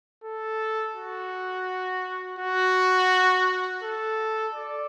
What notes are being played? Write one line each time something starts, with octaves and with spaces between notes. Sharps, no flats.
A4
F#4
F#4
A4
D5